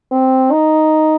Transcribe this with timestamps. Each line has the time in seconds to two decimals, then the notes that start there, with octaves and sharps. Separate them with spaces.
0.11 C4
0.52 D#4